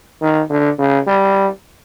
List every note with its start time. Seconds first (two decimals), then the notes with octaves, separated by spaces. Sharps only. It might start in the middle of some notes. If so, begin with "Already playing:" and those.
0.22 D#3
0.50 D3
0.79 C#3
1.07 G3